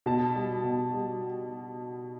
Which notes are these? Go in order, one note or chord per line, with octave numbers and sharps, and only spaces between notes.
B2 A5
G3
B2
G3